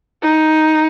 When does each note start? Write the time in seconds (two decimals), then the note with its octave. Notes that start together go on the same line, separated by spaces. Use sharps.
0.23 D#4